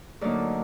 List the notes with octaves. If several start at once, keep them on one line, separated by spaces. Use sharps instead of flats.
D2 D3 F#3 A#3 D#4 D5